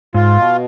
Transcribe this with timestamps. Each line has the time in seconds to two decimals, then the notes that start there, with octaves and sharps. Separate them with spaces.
0.14 G#2 F4
0.38 B2